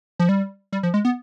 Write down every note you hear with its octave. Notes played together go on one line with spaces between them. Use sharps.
F3
G3
G3
F3
G#3
B3